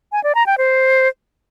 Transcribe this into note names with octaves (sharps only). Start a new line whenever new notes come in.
G#5
D5
A#5
G5
C5